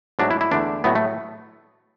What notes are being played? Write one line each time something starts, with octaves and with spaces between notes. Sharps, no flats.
G#2 F#3 A3 D4
E4
E4
E2 D3 A3 D4
A2 F#3 A3 B3
A3